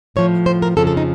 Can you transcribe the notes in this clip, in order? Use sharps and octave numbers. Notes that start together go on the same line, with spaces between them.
A2 F3 C#5
C5
A#4
F2 C#3 F3 A4
A4
D#4